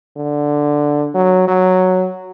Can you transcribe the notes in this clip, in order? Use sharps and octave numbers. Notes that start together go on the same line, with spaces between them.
D3
F#3
F#3